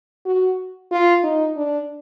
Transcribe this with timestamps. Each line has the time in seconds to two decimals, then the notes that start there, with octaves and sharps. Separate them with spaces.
0.25 F#4
0.91 F4
1.24 D#4
1.56 D4